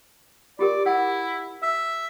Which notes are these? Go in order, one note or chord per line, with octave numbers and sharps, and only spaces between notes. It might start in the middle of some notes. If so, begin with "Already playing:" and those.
F4 G4 A#4 D5
E4 F#5 E6
E5